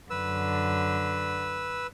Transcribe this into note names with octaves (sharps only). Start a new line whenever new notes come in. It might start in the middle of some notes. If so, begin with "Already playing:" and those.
F#2 D3 B4 E6